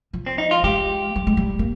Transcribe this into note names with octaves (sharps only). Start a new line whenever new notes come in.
F3
C4
D#4
F4
G#3 G4
G3
G#3
G3
A#3